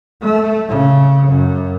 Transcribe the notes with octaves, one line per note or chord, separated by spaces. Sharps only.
A3
C#3
F#2